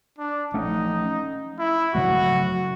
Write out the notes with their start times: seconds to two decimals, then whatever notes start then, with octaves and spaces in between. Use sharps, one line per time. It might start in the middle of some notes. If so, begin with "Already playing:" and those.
0.18 D4
0.54 F3 A3 C#4 D#4
1.59 E4
1.94 C#3 F#3 A3 F#4